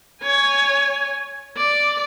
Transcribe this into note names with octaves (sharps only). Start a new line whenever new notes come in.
C#5 G#5
D5